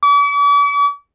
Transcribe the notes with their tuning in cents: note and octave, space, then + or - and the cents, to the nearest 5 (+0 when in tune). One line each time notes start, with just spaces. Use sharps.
D6 -45